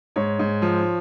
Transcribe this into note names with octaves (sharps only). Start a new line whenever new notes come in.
G#2 C#5
G#2
F3